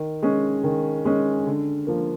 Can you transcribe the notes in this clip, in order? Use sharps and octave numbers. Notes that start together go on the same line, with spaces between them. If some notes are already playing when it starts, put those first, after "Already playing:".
Already playing: D#3
G#3 C#4
D#3
G#3 C#4
D3
F3 A#3